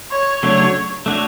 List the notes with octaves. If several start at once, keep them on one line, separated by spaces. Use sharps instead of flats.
C#5
C#3 F#3 A3 D4 C#5
A3 D4 F#4 C#5